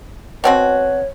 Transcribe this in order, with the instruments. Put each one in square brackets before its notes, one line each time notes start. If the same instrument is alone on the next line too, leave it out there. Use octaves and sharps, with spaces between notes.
[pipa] B2 C4 F#4 [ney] C#5